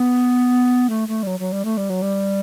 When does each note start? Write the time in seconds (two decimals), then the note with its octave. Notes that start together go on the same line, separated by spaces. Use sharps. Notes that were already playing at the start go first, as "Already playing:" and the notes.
Already playing: B3
0.90 A3
1.08 A3
1.23 G3
1.27 F#3
1.40 F#3
1.52 G3
1.65 A3
1.77 G3
1.90 F#3
2.02 G3